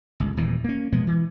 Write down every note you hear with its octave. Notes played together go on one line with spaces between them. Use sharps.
G1 C#2
D#1 E2 A#2 E3
A#3 C#4
B2 F3 G#3 B3
E3